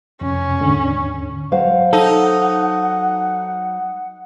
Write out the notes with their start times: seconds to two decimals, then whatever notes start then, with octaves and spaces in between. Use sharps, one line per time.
0.21 F2 C3 C#4
0.60 D#2 G#2 D3
1.52 F#3 C5 F5 F#5
1.93 D#4 A4